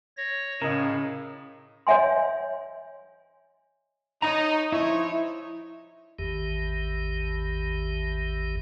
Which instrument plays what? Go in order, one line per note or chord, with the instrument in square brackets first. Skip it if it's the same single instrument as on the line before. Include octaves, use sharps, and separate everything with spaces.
[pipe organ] C#5 A#6
[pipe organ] A2 [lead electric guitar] C#3 [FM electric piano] A#4 D#5
[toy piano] C#5 D#5 E5 G#5 C6
[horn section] D#4 [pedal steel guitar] C#5 D#5 A#5
[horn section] F3 D#4 C#5 [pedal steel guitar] E4
[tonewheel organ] A1 E2 D#3 G4